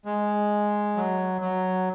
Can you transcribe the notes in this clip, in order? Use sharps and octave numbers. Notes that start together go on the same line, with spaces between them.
G#3
F#3
F#3